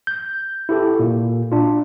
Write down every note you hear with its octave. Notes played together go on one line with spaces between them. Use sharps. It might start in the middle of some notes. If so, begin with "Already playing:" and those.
G6
E4 G4 A4
A#2
D4 F4